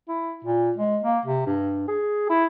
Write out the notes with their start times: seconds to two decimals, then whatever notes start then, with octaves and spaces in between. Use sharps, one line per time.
0.09 E4
0.45 A#2
0.77 G#3
1.03 A#3
1.26 C3
1.47 G2
1.88 G#4
2.30 E4